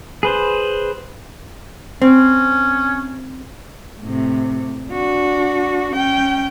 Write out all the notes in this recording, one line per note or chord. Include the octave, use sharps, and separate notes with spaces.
G#4 B4 C5
C4 C#4
A2 C3
D4 F#4
C#4 G5